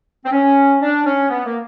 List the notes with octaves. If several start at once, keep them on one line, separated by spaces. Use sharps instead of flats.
C4
C#4
D4
C#4
B3
A#3